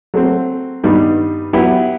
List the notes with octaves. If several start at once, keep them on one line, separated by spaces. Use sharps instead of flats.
F#3 A3 C4
G2 D#3 G3 B3 D#4
F#3 B3 E4 G4